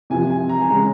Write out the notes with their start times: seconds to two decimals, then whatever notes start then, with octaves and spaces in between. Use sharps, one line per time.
0.10 C3 F3 C4 G#5
0.30 G#5
0.49 A#5
0.60 G#5
0.69 C#3 G#3 C#4 A#5